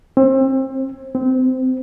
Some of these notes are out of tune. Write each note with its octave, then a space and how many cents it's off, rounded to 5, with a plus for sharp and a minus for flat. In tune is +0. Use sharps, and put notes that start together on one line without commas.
C4 +30
C4 -20